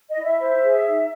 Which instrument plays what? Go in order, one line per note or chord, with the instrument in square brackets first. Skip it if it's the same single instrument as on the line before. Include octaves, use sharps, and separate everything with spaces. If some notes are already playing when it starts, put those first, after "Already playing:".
[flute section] D#5
E4
E5
C5
G#4
D#4